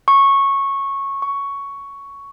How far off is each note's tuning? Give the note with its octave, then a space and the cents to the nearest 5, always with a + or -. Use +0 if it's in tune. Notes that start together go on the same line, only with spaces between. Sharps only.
C#6 -10
C#6 +10